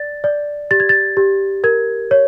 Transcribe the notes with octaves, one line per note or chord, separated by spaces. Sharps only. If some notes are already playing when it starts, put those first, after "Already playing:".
Already playing: D5 A6
D5
G4 A6
G#6
A6
G4
A#4 G#6
C#5